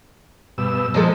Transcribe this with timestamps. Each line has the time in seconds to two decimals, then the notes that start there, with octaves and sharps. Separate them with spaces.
0.58 G2 B2 E6
0.94 F3 G#3 A#3 A4